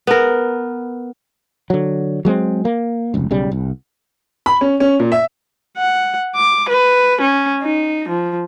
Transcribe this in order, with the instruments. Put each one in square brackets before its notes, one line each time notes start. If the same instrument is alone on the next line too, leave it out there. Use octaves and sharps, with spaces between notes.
[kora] B3 A#4
[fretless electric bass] D3 F#3
F#3 G#3 A#3 C4
A#3
F1 C#2
B1 C#3 G3
C2
[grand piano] B5
C#4
C#4
A#2
E5
[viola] F#5
D6
B4
C#4
D#4
F3